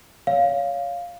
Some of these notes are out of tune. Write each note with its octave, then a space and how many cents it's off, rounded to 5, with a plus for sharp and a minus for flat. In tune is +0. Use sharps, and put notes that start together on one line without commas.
C#5 +25 F5 +0